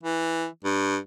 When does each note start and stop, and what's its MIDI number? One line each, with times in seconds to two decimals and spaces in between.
0.03 0.46 52
0.64 0.97 43